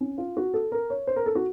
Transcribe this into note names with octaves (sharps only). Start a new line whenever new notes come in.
C#4
F4
F#4
A4
A#4
C#5
C5
A#4
A4
F#4